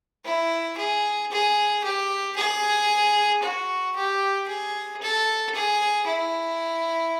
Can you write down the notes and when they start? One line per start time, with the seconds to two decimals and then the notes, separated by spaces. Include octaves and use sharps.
0.25 E4
0.78 G#4
1.32 G#4
1.84 G4
2.37 G#4
3.43 F#4
3.96 G4
4.48 G#4
5.01 A4
5.55 G#4
6.07 E4